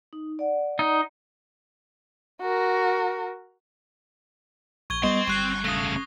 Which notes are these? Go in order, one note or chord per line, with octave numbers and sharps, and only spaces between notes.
D#4
D5 F#5
D#4
F#4 A#4
A#1 C#6 G#6 G7
G3 B3 C4 D#5 C6
G1 G3 C#6 F#6 C7
C#3 A3 D#6 A#6